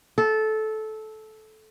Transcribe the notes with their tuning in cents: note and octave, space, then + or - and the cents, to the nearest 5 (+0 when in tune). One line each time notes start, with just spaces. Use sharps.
A4 -15